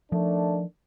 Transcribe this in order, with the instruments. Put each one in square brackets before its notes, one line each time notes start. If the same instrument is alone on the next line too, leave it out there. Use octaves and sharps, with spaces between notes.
[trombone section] D#3 A3 D4 [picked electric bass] F3